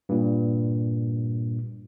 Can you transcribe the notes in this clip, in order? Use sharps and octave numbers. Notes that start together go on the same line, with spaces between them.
G2 A#2